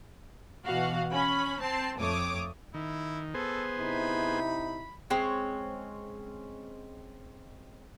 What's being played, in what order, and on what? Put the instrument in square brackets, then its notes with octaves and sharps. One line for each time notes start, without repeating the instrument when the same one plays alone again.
[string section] B2 E3 F#4 F5 F#5
C#4 B5
C4 A5 C7
F2 A3 C#5 D6 D#6
[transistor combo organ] D#3 [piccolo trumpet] E4
[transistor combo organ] B3 G#4 C5 [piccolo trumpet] A4
[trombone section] C3 D#4 E4 [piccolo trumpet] B5
[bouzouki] G#3 C4 C#4 C#5